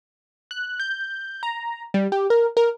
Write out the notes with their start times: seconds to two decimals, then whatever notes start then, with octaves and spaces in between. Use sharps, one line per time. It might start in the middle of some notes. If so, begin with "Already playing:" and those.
0.51 F#6
0.80 G6
1.43 A#5
1.94 G3
2.12 G4
2.30 A#4
2.57 A#4